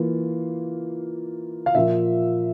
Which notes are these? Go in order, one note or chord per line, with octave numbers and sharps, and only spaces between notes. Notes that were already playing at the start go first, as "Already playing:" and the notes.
Already playing: E3 A#3 F4
F5
A#2 F3 A#3 F4 E5